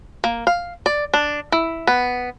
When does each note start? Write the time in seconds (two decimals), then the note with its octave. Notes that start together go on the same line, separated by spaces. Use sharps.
0.24 A#3
0.47 F5
0.86 D5
1.14 D4
1.52 E4
1.87 B3